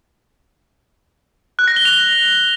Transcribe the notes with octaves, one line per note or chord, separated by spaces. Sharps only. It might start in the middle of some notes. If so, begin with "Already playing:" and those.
F#6
A#6
G7
F7